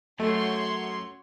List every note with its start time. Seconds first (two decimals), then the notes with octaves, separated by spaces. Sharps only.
0.20 F#2 A3 F#4 C#5 C6